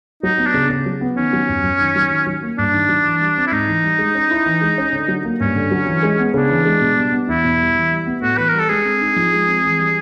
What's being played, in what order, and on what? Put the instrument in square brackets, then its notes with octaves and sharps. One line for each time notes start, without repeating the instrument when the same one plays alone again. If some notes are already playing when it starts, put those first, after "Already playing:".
[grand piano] F#3 [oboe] D#4
[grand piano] B3
[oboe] D4
[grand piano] C#3
C#3
F#3
B3
[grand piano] D#3 [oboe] C#4
[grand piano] F#3
F#2
F#2
D#3
F#3
D#3
F#3
A#3
[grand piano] G2 [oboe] D4
[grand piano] D#3
F#3
E3
G3
C4
[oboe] E4
[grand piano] G#2 [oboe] D#4
[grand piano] E3
G3
G#3
C#4
E4
E3
G#3
C#4
D3
F#3
A#3
[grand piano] G2 [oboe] C#4
[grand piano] D3
F#3
E3
G#3
B3
[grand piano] C#3 [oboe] D4
[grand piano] E3
G#3
B2
G3
B3
[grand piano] E2 [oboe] E4
[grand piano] B2
G3
E3
G3
B3
[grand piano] A2 [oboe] F#4
[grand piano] E3 [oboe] B4
[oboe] A#4
[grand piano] G3
[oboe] A4
[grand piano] G#3 [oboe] G#4
[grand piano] C4
D#4
F3
G#3
C4
E3
G3